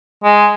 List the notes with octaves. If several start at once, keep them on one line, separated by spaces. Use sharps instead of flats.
G#3